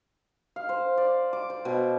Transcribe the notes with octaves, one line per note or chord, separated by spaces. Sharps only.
F5
C5
D5
D6
C5
B2